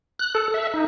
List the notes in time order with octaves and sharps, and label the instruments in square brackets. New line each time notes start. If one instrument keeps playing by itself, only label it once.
[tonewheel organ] F#6
A4
E5
D#4